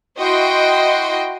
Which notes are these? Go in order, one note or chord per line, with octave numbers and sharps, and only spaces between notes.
E4 F#4 D#5 G5 C6